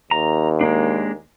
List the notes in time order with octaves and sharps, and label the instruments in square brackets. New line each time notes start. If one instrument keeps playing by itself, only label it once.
[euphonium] D#2 [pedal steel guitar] A#5
[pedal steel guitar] G#3 A#3 D4